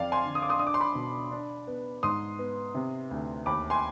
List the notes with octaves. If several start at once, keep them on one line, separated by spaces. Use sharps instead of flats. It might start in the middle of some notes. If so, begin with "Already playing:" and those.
Already playing: F2 D5 F5
G#5 C6
D3
D#6
D6
C6 D#6
D4 D#6
D6
C6
B5 D6
B2
D4
B3
G#2 C6 D#6
B3
C3
D2
D#2 B5 D6
G#5 C6